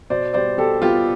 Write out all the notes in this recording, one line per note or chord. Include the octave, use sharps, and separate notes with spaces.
B2 C5 D5
G3 B3 C5 D5
B2 G4 A4
G3 B3 F4 G4